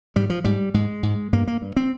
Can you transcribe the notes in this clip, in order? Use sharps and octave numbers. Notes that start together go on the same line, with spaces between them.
G#2 G3
F3
G#2 G3
G#2 G#3
G#2
G2 A#3
A#3
G2
C4